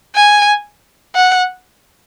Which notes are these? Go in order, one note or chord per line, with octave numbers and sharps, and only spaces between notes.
G#5
F#5